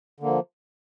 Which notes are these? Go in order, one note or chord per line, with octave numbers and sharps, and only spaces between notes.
D3 F3 A#3